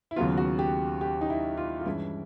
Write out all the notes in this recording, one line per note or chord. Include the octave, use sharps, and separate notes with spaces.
E4
D#2 C#3 F#3 B3 F4
F#4
G4
G4
D#4
E4
F4
F4
G2 E3 G#3 C#4 E4